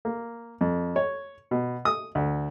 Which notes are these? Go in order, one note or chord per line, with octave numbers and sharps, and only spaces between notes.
A#3
F2
C#5
B2
D#6
D2